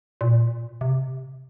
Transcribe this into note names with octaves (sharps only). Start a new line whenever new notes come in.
A#2
C3